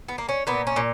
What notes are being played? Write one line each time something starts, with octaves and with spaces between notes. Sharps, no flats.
B3
A#3
C#4
A#2 B3
C#4
A#2